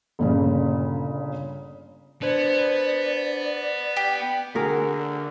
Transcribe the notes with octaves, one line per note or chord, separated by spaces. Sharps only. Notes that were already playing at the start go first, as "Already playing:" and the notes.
G1 A#2 C#3
B3 D4 C5 D5 G#6
G4
D3 F#4 G#4 A#4